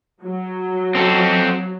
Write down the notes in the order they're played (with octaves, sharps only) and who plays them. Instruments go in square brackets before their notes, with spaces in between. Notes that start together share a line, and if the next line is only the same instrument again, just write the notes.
[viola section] F#3
[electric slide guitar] C4 A4